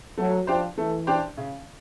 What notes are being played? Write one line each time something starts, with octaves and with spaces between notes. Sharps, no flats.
F#3 A3
F3 D4 G4 C5
E3 A3
D4 G4 C5
C#3